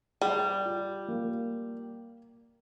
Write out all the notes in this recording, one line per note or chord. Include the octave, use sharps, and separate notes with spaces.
G3 G#4
F4
A#3